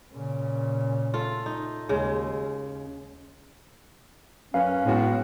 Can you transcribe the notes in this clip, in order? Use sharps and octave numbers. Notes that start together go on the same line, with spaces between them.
A#2 C#3
A3 F4
D#4
D#2 C#3 G#3
F#2 C#4 B4 F5
A2 G#3 B3 F#4